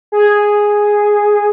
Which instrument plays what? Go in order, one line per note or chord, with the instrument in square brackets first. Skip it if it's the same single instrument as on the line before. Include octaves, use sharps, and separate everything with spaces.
[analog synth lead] G#4